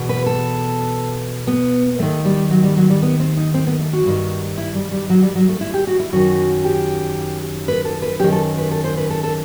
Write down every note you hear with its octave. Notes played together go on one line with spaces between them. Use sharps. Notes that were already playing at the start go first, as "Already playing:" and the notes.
Already playing: E2 B2
B4
A4
B3
D#2 D#3 A3
G3
F#3
G3
F#3
G3
B3
C4
D#4
C4
B3
A3
F#4
G2 D#3
E4
G3
G3
F#3
G3
F#3
A3
E4
G4
F#4
E4
F#2 D#3 F#4
G4
B4
A4
B4
F#2 D#3 G4
A4
B4
A4
C5
B4
A4
A4